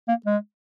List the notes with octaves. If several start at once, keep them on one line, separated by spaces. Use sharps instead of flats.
A#3
G#3